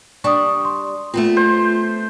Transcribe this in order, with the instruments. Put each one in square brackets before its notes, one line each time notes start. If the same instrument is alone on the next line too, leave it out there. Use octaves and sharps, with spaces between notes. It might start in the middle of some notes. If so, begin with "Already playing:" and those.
[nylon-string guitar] G3 D4 [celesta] C#6 D#6
[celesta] C6
[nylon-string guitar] A3 B3 C4 [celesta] F4
[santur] C5